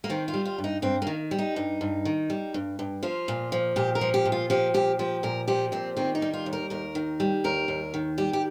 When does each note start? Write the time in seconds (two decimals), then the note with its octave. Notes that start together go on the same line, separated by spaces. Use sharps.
0.04 A#3
0.09 D#3 C4
0.28 F4
0.34 G3
0.45 F4
0.58 G2
0.64 D#4
0.82 G2 C4
1.02 D#3 A#3
1.31 G3
1.38 D#4
1.56 G2
1.81 G2
2.05 D#3
2.30 G3
2.54 G2
2.79 G2
3.03 F3 F4
3.28 A#2
3.52 F3
3.76 A#2 G4
3.95 A#4
4.01 F3
4.14 G4
4.25 A#2
4.32 F4
4.50 F3 G4
4.74 A#2 G4
4.99 F3 G4
5.23 A#2 A#4
5.48 F3 G4
5.72 A#2 C4
5.97 D#3 C4
6.15 D#4
6.22 G3
6.33 F4
6.46 D#2
6.53 A#4
6.70 D#2 A#4
6.95 D#3
7.20 G3
7.44 D#2 A#4
7.68 D#2
7.94 D#3
8.18 G3 G4
8.33 G4